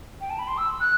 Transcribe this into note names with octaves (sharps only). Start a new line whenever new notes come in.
G5
A5
B5
C6
E6
F#6